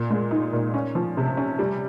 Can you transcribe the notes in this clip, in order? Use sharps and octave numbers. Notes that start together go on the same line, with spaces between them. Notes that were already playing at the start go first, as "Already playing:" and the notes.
Already playing: A#2
G#3
D#4
A#2
C#4
F3
C3
C#4
G3